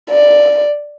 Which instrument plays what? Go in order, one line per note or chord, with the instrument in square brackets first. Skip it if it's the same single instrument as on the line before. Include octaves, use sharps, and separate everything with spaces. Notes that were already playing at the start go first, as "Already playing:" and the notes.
[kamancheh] D5